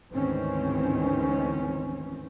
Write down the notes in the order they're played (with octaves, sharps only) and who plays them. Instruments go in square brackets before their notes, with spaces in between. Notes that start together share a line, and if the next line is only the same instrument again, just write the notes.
[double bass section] D2 G#2 D#3 E3 C4 C#4